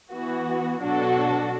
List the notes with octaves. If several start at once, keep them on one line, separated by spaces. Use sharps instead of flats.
E3 B3 F#4
B2 F#3 D4 F#4 A4